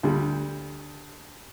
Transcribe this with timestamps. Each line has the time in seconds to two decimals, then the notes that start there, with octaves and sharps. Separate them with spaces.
0.03 D2 G3